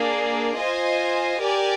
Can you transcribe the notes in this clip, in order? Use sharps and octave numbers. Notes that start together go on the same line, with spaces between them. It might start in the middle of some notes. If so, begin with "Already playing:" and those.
Already playing: A#3 D4 G#4 D5
F4 C5 D#5 G#5
G4 A#4 D5 G#5